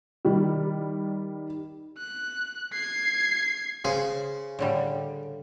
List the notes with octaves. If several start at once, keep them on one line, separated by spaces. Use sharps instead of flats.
D#3 G3
F#6
G#6 C7
C#3 G#4 C5
A2 D3 G3